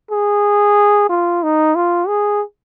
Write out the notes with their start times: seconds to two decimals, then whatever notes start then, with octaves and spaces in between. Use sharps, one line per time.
0.11 G#4
1.09 F4
1.43 D#4
1.75 F4
2.08 G#4